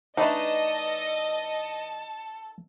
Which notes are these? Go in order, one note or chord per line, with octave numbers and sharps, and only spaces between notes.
E3 A3 D4 D#4 A4 B4 D#5